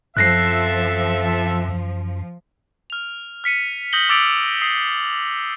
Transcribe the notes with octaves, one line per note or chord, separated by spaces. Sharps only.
F#2 F3 C4 A4 E5 F#6 A#6 C7
F6 F7
F6 B6 C#7 D#7
D#6 G6 A#6 F#7 G7
D6 E6 A6 C#7 D7 F7
D#6 C7